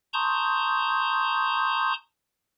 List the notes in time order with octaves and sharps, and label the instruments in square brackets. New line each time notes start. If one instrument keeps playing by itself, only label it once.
[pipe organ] A5 A#5 C6 C#6 D#6 G6